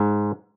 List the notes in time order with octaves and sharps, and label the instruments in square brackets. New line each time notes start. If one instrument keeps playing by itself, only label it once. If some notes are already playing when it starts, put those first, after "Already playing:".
Already playing: [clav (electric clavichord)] G#2